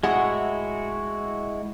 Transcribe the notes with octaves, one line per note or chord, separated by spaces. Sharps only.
A2 G#3 E4 F#4 G#4 F#5